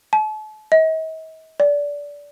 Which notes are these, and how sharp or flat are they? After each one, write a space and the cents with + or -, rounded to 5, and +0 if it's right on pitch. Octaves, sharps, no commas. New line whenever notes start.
A5 -40
D#5 +45
D5 -20